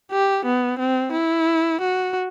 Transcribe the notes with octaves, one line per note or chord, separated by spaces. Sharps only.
G4
B3
C4
E4
F#4